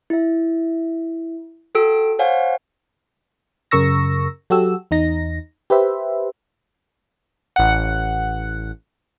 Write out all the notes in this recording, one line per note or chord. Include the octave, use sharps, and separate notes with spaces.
E4 E5
F#4 A4 G5 E6 D7
C5 C#5 F5 F#5 G#5
F#2 C#3 A#4 C#6 E6 A#6
F#3 F#4 G4 A4 E6
E2 D#4 A#6
G4 B4 C5 E5
A1 F#5